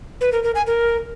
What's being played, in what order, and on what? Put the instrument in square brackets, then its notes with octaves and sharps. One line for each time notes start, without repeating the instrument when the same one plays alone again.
[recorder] B4
A#4
A#4
G#5
A#4